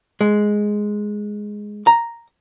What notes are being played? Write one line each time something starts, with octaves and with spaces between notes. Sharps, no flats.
G#3
A#5